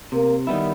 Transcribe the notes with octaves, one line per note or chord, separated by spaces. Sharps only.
C3 A#3
D#3 G3 B3 E4